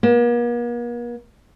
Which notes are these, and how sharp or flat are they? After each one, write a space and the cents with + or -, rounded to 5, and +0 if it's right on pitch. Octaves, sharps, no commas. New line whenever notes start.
A#3 +45